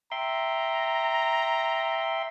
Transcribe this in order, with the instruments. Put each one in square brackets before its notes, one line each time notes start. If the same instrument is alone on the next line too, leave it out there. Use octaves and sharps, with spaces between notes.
[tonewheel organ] E5 G5 C6 [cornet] A#5